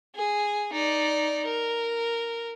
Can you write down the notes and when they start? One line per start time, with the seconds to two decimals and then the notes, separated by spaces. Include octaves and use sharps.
0.15 G#4
0.73 D#4 D5
1.46 A#4